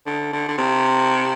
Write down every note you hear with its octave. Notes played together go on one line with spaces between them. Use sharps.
D3
D3
D3
C3